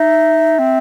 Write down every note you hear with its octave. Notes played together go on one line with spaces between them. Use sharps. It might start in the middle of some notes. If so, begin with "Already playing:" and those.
Already playing: D#4 E5
C4